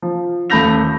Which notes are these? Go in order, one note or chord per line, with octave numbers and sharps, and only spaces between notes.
F3
D#1 A3 B5 G6 A#6 F7